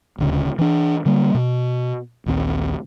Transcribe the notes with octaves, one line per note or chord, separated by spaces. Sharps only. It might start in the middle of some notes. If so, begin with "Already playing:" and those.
D#1 D2 C#3
E3 D4
D3 G3 A#3
B2
A#1 D#2 C4